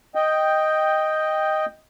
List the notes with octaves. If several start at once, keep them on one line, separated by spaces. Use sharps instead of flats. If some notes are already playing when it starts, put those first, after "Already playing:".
D#5 G5